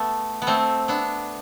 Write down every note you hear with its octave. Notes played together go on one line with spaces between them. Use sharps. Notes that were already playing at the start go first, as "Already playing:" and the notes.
Already playing: A3 B3
B3
A3 C4
B3 D4